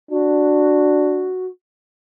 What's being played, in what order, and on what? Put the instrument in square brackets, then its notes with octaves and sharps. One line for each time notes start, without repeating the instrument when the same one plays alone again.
[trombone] D4 [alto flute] F#4